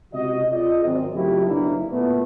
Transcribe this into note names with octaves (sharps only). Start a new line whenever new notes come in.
C#2 C3 F#4 D#5
F4 G#4 D5 D#5
G#1 F#2 C4
C#3 F#3 A3 E4 F4 G4
F#1 B1 D3 A#3 D4 E4
A#2 A3 B3